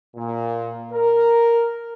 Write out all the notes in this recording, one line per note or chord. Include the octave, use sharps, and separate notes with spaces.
A#2
A#4